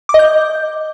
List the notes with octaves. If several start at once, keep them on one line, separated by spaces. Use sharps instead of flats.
D6
D#5
G6